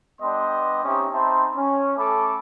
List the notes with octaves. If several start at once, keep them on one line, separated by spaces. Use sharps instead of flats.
G3 B3 D4 D#5 G5 C6
C4 C#4 D#4 G4 E5 D#6
C4 D#4 E5 A5 B5 C6
C#4
A3 C#4 A4 B5 D6